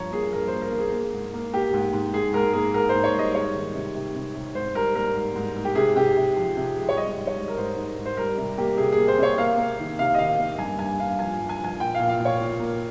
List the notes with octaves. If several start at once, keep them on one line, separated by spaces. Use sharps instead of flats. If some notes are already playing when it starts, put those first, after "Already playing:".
Already playing: G2 F3 C#5 A#5
A#3 G#4
G2 A#4
C5
A#3
A#4
A#3
G#4
A#3
G#2
A#3
A#3 G4
G#2
G#2
G#2 G#4
G#2 A#4
A#3 G#4
G#2 A#4
G#2 C5
C#5
G3 D#5
G#3 C#5
D#3
C3
C3
C3
C3
G#2 C5
G3 A#4
A#3 A#4
G#2
G#2
G#2
G4
C3 G#4
C3 G4
C3
F3
C3
G#3
C#5
G3 D#5
G#2
C#5
G#2
A#4
G#2 C5
G#2
G#2
C5
G3 A#4
C3
A#3 G4
C3 G#4
G#4
A#3
C5
C3 C#5
A#3 F5
A#3
D#3
C3 F5
D#5
D#3 F5
A#3
G2 G#5
G2 G#5
G2 F5
F3 G#5
G2
G#5
F3 G#5
A#2 G5
A#2 F5
F5
A#2
C#5
A#2
A#3